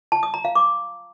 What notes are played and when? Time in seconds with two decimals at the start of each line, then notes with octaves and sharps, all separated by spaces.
0.12 A5
0.23 D#6
0.34 A#5
0.45 F5
0.55 D6